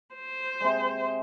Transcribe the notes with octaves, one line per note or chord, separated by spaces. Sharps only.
C5
C3 G#3